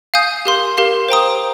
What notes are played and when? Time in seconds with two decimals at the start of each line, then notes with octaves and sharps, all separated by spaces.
0.14 F5 G#5 D#6 G6
0.45 G4 A#4 F5 C6
0.77 G4 A#4 F5 C6
1.08 C5 G5 A#5 D#6